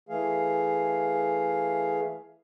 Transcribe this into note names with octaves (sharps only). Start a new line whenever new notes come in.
E3 A3 G#4 F5